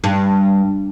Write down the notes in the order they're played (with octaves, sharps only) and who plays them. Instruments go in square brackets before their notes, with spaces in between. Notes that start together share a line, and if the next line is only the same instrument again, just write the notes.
[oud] G2